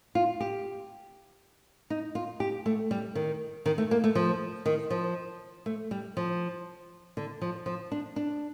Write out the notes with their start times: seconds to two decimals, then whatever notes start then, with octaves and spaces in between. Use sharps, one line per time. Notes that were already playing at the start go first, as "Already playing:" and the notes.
0.15 F4
0.40 G4
1.90 D#4
2.15 F4
2.40 G4
2.66 A3
2.91 G3
3.15 D#3
3.66 D#3
3.78 A3
3.91 A#3
4.04 A3
4.15 F3
4.66 D#3
4.90 F3
5.66 A3
5.91 G3
6.17 F3
7.17 D3
7.41 F3
7.66 F3
7.92 D4
8.16 D4